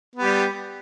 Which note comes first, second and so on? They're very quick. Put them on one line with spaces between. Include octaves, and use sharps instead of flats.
B3 G4 G3